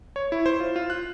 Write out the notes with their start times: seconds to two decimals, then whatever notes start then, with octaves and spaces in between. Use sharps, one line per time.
0.16 C#5
0.32 E4
0.46 C5
0.60 F4
0.76 F4
0.90 F#6